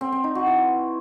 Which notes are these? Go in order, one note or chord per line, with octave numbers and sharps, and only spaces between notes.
C4
C4
D#4
F#4
E3